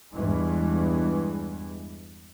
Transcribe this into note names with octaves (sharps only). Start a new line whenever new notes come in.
E2 G2 E3 G#3